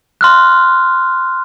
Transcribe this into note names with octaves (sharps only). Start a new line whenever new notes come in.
C6 F6 F#6